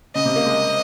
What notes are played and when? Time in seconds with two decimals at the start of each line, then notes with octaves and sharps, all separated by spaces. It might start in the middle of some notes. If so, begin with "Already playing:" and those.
0.15 C#3 D#5
0.25 C3
0.36 A#3
0.46 G#3